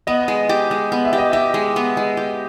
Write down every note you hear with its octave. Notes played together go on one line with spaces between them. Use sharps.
B3 D#5
G#3
G4
G#3
B3
E5
G4
D#5
G4 E5
G#3
B3
G#3
G4